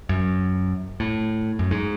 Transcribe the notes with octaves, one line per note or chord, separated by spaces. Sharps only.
F#2
A2
F#2
G#2